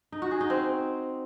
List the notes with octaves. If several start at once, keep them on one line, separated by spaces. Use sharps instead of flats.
D#4
F#4
G#4
D#4
C4